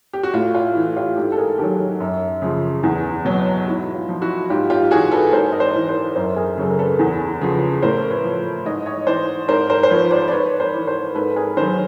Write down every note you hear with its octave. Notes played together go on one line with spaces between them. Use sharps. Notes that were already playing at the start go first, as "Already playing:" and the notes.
G4
F#4
A2 F4
F4
E3
F4 G4
G#2 G4 A4
A4
G#4 A#4
D#3 F#3 G4 A4
F#2
C#3 F3
E2
B2 F#3
G#2 E4 F#4
F4
F3
E4 F#4
G#2 F4 G4
F4 G4
E3 F#4 G#4
A4 B4
G#2 A#4 C5
D#5
C5 D5
E3
A#4 C5
F#2 A#4 C5
G#4 A#4
C#3 F#3 A4
A#4
A4 B4
E2
C#3 F3
A2 A#4 C5
B4 C#5
F3
G#2 C#5 D#5
C#5 D#5
E3 C5 D5
G#2 A#4 C5
A#4 C5
C5
F3 B4 C#5
C5 D5
D5
G#2 B4 C#5
A#4 C5
E3
A#4 C5
G#2 A4 B4
G#4 A#4
D#3 F#3 A#4 C5